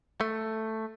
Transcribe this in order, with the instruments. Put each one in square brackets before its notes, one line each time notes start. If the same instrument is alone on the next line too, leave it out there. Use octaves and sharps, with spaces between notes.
[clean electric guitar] A3